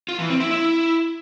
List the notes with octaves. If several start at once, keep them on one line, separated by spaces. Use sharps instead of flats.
F4
E3
C4
E4
E4